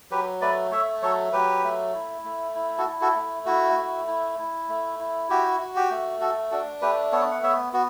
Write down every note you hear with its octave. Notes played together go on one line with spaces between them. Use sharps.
F#3 G4 B4
A3 B4 D5
A3 C#5 E5
F#3 A4 C#5
F#3 G4 B4
A3
E4
A3
E4
F#4 A4
E4
F#4 A4
A3
E4 F#4
A3
E4
E4
A3
E4
F#4 G4
F#4
G4
A3
F#4 A4
D4 F#4 A4
A3 G4 B4
B3 A4 C#5
F#5
B3 C#5 E5
B3 F#4